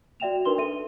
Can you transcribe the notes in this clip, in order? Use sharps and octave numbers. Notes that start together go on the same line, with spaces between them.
F#4 D5 E5 G5 E7 F7
D4 D#4 A#4 B4 C6 G7
A4 E5 D#7